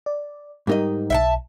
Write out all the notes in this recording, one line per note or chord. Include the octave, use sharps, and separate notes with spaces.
D5
G#2 G3 D#4 G4 A#4 D#5
B1 E5 G5 A5